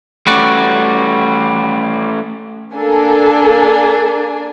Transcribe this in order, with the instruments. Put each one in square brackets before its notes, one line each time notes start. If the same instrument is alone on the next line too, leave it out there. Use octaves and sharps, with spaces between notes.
[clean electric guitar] G3 F#4 D5 [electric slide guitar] A3 C#4
[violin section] A#3 D4 G#5 [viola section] A4